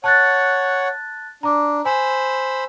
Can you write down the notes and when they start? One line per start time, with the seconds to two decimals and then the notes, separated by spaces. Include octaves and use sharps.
0.04 C#5 F#5 A5 F#6 A6
1.43 D4 A#5 D6
1.86 C5 G#5 B5 E6